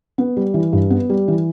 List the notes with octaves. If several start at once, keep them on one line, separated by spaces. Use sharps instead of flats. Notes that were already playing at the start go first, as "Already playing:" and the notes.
B3
G3
E3
G2
B3
G3
E3